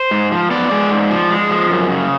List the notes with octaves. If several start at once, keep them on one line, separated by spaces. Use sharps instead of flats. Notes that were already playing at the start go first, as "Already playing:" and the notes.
Already playing: C5
G#2
F3
B3 D5
G#3
G#2
F3
G#3
F3
F#2
C#3